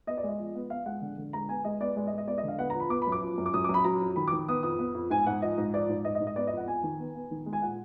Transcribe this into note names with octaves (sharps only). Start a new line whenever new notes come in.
B3 D#5
D5
G#3 D#5
F3
B3
B3 F5
G#3 F#5
D3
D3
G#3 A#5
B3 G#5
G#3 D#5
B3 D5
G#3 D5
D#5
G#3
D#5
B3 D5
D#5
D3 F5
B3 F#5
A#5
F3 B5
B3 D6
B5
F#2
D6
F3
F#2
D6
F#2 D#6
D6
F#2
B5
F#3 A#5
F2
D#3 B5
D6
D#3
B3 D#6
F2 D#6
B3
F2
G#2 G#5
G#2 F#5
F3 D#5
G#2
F3 D5
G#2
G#2 D#5
D#5
G#2
D#5
B3 D5
D#5
F2 F#5
F2 G#5
D#3
B3
B3
D#3
G#3
G#5
A#2 F#5